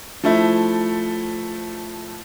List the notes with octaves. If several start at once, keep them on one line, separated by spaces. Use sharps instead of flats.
F3 A3 E4